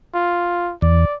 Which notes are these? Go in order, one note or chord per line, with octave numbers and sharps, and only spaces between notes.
F4
E2 D5